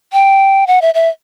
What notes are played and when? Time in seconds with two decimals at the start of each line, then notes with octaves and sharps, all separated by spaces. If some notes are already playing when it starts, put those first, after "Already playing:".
0.13 G5
0.67 F#5
0.82 E5
0.94 E5